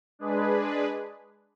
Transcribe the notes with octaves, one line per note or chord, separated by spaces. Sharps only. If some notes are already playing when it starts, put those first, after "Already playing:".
G#3 D4 G#4 B4